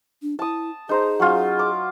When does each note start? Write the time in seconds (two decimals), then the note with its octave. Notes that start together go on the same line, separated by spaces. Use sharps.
0.22 D4
0.39 E4 A5 D#6
0.89 D#4 G#4 C5 A#5
1.20 F#3 C#4 F4
1.59 D6